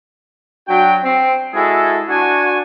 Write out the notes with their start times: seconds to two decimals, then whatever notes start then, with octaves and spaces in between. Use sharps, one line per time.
0.68 F#3 D4 F#4 G5
1.03 C4
1.54 G#3 E4 F#4 G#4 A4
2.09 D4 F#4 G#5